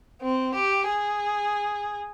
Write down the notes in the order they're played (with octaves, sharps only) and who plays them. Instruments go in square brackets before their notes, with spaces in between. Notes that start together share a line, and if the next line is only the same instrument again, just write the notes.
[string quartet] C4
G4
G#4